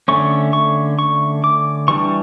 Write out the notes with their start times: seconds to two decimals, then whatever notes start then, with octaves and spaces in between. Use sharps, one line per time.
0.08 D3 A3 C#4 C#6
0.53 C#6
0.99 C#6
1.44 D6
1.88 E3 G3 D4 C#6